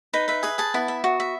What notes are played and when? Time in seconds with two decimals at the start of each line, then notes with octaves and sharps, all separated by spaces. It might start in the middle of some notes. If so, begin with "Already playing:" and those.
0.14 D#4 B4
0.28 B4 E5
0.43 G#4 B4
0.58 G#4 A5
0.74 B3 E4
0.88 E5
1.04 F#4
1.20 E5